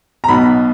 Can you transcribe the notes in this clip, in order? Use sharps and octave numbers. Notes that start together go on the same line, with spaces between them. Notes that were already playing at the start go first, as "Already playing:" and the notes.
A#5
B1 B2 B5